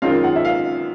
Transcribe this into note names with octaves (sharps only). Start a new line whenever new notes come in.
F#2 D#3 G#3 C4 F4 F5
F#5
E5
F5